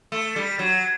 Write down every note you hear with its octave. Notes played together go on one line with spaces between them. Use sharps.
A3
G3
F#3